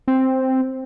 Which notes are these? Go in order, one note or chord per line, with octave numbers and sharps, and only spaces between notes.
C4